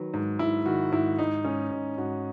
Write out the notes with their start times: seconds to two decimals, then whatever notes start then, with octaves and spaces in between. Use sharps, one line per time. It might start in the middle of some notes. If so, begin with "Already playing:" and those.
Already playing: D#3 F#3 B4
0.14 G#2
0.39 G#2 E4
0.66 D#3 F#4
0.92 G#2 E4
1.18 G#2 D#4
1.45 G#2 C#4
1.71 G#2 D#4
1.98 G#2 F#4